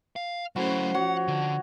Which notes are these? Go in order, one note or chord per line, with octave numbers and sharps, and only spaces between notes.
F5
F#3 A3 C#4 E4 F#4 C5
F3 F#4 C#5 F#5
D3